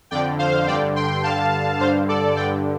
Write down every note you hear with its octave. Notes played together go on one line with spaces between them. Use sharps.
F2 D3 D5 G5
C5 F5
G2 D3 D5 G5
G5 C6
G2 D3 F5 A5
G2 D3 C5 F5
A4 D5
G2 D3 D5 G5